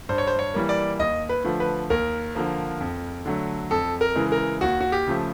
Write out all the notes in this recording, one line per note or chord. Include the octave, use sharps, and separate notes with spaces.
G2 C5
C#5
C5
C#5
E3 G3 A#3
D5
D#2 D#5
B4
D3 F3 A3
B4
D#2 A#4
D3 F3 A#3
F2
D3 F#3 A3
F2 A4
A#4
C#3 E3 G#3
A#4
D#2 F#4
F#4
G4
C#3 F3 A3